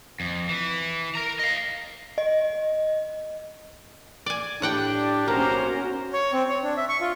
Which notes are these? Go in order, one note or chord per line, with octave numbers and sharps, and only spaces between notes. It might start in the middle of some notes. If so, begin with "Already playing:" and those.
F2
E3
A#4 A#5
D#5 F5
D#5
D5 G#5
A2 D4 G4 D5 F#5 G5
B1 A#3 C#4 F#4 A#4 C5 A#5
C#5
C4
C#5
D4
E5
C#6
F4